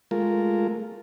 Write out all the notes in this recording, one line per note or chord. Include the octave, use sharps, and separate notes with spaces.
G#3 A3 F4 A#4